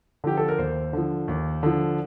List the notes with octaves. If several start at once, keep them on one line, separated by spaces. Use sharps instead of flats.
D3 F3 G4
A4
A#4
D#2 C5
D3 F3
D#2
D3 F3